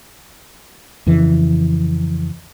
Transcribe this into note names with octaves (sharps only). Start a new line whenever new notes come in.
F2 C#3 E3